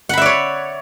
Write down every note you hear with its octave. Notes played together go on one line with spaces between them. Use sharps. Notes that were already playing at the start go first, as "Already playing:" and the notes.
C#5 D5 E5 F#5 B5